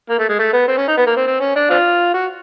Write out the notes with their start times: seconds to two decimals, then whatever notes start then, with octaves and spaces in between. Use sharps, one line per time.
0.09 A#3
0.19 A3
0.29 G#3
0.39 A3
0.53 B3
0.68 C4
0.78 C#4
0.88 D#4
0.97 B3
1.07 A#3
1.16 C4
1.27 C4
1.41 C#4
1.56 D4
1.70 C4 D4 F4
2.14 F#4